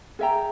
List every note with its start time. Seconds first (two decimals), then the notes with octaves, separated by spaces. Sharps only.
0.19 G#4 E5 G5 A#5